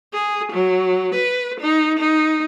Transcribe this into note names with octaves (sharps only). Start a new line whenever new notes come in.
G#4
F#3
B4
D#4
D#4